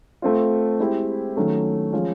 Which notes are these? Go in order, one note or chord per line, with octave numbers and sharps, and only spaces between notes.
A3 C4 F4
G#3 C4 E4 G4
D#3 F#3 A3 C#4
F3 G#3 C#4